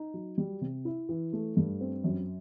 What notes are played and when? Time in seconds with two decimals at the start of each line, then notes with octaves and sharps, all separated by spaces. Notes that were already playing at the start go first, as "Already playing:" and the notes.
Already playing: D#4
0.14 F#3
0.38 G3
0.61 C3
0.85 E4
1.09 E3
1.33 A3
1.57 G2
1.81 C4
2.04 F#2